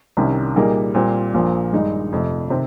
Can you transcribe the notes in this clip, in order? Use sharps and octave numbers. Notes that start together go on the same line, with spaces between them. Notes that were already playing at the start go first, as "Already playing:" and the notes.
C2 C3 D#3 G3 C#4
A#2 G3 A#3 D#4 G#4
A#2 G3 C4
A#1 A#2 F3
G2 D#3 G#3 D#4
F1 F2 C3
C3 D#3 C4